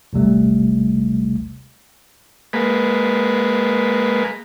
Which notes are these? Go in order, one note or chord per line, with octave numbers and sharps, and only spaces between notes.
A1 D#2 C3 G3 A3
G#3 A#3 B4